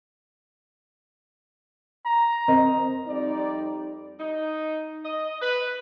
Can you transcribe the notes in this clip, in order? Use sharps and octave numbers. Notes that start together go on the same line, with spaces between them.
A#5
C4 A#4 D#5
F2 G3 C4 D#4 D5
D#4
D#5
B4